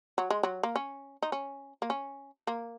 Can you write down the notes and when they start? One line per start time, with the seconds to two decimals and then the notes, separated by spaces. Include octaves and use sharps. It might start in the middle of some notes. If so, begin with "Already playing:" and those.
0.18 F#3
0.30 G#3
0.43 F#3
0.63 A#3
0.76 C#4
1.22 D#4
1.32 C#4
1.82 A#3
1.90 C#4
2.47 A#3